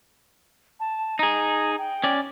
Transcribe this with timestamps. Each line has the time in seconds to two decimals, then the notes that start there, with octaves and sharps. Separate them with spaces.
0.80 A5
1.19 D#4 G#4 A#5
1.78 G5
2.04 C#4 D5